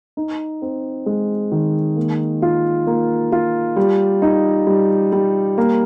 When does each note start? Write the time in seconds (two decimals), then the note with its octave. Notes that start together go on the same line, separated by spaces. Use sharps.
0.17 D#4
0.62 C4
1.06 G#3
1.52 D#3
1.97 A#3
2.42 F4
2.87 A#3
3.32 F4
3.76 G3
4.22 D#4
4.67 G3
5.12 G3
5.58 A#3